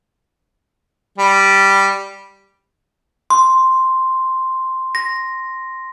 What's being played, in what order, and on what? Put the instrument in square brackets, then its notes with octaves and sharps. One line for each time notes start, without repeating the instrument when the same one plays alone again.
[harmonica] G3
[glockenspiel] C6
A#6